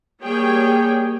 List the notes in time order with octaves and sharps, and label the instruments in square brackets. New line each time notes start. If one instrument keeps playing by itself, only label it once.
[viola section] G3 A#3 G#4 C#5 G5